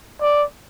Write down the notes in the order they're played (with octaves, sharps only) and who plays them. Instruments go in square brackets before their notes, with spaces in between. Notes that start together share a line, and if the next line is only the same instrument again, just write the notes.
[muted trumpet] D5